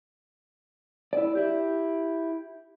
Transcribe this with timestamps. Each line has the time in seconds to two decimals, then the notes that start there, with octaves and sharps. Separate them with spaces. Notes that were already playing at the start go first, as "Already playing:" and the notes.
1.13 E4 D5
1.35 E4 G4